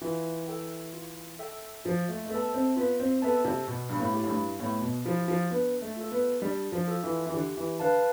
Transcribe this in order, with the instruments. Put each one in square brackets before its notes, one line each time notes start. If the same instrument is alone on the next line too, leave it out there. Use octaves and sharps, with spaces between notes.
[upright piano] E3 [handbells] F4
[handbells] A4 E5 G5
F4
A4 E5 G5
[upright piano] F3 [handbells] F4
[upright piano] A3
A3
[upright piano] B3 [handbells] A4 E5 A5
[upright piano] C4
[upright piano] B3 [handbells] F4
[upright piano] C4
[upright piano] B3 [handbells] A4 E5 A5
[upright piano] C3
[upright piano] B2 [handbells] B3
[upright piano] G2
A2
[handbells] E4 G4
[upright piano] A2
G2
[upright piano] A2 [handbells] B3
[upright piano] B2
[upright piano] F3 [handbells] E4 G4
[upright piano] F3
[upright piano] B3 [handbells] D4
[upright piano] A3
[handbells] F4 A4
[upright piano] B3
[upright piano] G3 [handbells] D4
[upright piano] F3
[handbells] F4 A4
[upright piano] E3
E3
[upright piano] D3 [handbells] G4
[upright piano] E3
[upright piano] D3 [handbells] B4 F5 A5